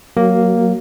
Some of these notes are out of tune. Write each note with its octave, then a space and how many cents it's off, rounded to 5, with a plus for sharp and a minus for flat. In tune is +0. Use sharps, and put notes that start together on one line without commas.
F#3 +0 A#3 +0 F#4 +35